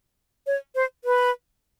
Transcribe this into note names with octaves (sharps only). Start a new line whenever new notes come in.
C#5
C5
B4